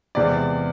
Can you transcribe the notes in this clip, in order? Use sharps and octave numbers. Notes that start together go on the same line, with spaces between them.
E2 C3 G#3 D5